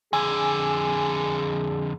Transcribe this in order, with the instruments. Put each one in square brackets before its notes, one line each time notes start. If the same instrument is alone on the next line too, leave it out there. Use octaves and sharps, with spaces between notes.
[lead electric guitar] F2 D3 [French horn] G#4 [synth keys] G#5